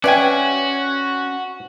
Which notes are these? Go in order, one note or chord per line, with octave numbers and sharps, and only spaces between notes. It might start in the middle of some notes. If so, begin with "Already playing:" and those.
C#4 F#4 B4 D5 E5 G5 G#5